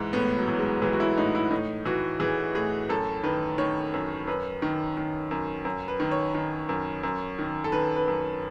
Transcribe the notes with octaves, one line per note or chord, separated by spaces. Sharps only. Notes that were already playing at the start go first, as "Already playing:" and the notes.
Already playing: G#2 E3
A2 B3
F#3
E3
G#3
E3 G#3
F#4
E4
A2 D#4
E4
A2 D#4
E3 F#4
E3 G#4
A2 G#4
F#2 A4
D#3 B4
D#3 C#5
F#2
F#2 B4
D#3
D#3
F#2
F#2
B4
D#3
C#5
D#3
F#2
F#2
D#3
A4
D#3 B4
B4
F#2